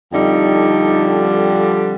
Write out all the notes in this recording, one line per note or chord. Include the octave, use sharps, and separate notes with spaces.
F2 D3 G3 D#4